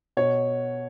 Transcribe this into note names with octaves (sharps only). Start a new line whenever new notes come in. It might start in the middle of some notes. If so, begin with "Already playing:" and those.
B2 C#5